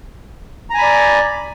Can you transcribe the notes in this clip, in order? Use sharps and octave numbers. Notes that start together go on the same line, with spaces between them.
D5 G#5 A#5 B5